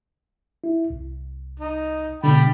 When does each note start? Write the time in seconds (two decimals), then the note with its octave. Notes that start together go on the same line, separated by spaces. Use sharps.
0.64 E4
0.90 C2
1.60 D#4
2.24 B2 D3 G5 B5